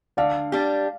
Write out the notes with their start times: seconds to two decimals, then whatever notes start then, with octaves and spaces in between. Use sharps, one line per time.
0.17 D3 D5 F5
0.52 G3 D4 G4